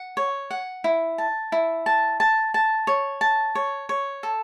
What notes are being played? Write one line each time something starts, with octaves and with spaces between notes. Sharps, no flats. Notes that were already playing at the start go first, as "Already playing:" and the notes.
Already playing: F#5
C#5
F#5
E4
A5
E4
A5
A5
A5
C#5
A5
C#5
C#5
A4